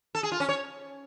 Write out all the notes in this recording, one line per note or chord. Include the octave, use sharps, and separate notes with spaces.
A4
G#4
F4
C#4
C#5